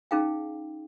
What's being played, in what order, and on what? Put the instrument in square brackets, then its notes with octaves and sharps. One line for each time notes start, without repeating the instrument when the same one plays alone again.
[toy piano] C#4 D#4 G#4 F5 G5